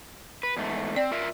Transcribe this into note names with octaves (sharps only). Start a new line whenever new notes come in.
B4
E2 G#2 A3
C4 D5
F4 A#4 E5